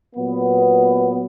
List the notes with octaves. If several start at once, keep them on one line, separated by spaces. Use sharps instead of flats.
A#2 F#3 B3